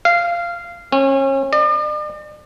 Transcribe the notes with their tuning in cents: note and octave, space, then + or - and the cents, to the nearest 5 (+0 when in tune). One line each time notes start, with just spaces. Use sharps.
F5 -15
C#4 -35
D5 +45